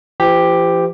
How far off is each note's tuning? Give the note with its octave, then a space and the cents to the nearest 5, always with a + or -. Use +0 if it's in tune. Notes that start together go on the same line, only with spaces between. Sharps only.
F3 -45 G4 +5